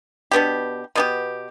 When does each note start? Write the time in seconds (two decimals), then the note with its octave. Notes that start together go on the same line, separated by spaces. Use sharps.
0.31 B2 B3 D4 G4
0.95 B2 B3 D4 G4